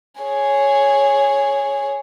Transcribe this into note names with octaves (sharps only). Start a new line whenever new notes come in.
G#4 C#5